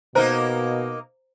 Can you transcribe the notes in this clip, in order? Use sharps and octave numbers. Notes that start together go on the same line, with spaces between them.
B2 A#3 D#4 A#4 C5 A#5